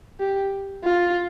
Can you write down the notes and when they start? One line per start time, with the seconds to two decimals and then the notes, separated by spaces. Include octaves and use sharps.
0.20 G4
0.84 F4